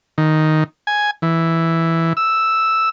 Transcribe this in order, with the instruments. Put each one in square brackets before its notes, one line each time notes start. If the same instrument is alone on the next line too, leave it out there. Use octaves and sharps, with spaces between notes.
[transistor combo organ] D#3
G#5
E3
E6